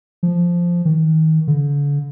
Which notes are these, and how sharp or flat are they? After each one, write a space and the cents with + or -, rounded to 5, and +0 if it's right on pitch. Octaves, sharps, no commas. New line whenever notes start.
F3 -5
D#3 +30
D3 -40